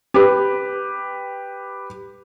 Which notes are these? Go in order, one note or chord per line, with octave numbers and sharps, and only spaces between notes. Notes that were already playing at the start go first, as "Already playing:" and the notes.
G4 B4